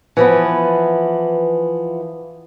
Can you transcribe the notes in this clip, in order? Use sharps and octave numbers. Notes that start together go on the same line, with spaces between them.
E3 F3 B3